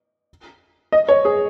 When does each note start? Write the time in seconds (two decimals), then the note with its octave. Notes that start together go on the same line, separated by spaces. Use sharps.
0.92 D#5
1.09 C#5
1.25 G#4